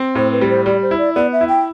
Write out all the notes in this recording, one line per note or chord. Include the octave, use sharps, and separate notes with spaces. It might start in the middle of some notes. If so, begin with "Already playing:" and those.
Already playing: C4
A2 C5
B4
G3
C5
G3 D5
C5
E4
D5
B3 D5
E5
E4
G5